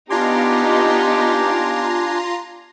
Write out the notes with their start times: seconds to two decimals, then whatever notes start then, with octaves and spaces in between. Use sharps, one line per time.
0.10 B3 D4 D#4 F4 G4 G#5 A#5 C6